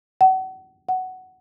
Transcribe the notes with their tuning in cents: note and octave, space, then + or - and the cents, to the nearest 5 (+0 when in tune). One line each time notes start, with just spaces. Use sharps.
F#5 +35
F#5 +10